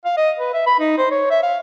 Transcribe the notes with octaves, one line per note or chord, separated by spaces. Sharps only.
F5
D#5
B4
E5
B5
D#4
C5
C#5
E5
F5